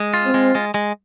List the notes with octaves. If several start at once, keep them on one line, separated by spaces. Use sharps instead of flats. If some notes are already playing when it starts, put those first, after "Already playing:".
Already playing: G#3
F4
C4
G#3
G#3
G#3